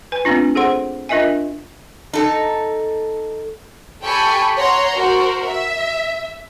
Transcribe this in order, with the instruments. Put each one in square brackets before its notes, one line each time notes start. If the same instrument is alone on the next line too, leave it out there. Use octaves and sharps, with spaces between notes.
[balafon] B4 G#5
A3 B3 C4 D4 F4
G#4 A4 C5 F#5 C6
D4 F4 A#4 D#5 E5 G#5
[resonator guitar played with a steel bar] D#4 A4
[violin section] G4 A4 G5 G#5 B5 C#6
C#5 F#5 A#5 C6
F#4 A#4 C5
E5